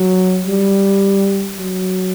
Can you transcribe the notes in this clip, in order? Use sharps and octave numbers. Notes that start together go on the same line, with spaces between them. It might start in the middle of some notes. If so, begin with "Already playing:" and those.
Already playing: F#3
G3
F#3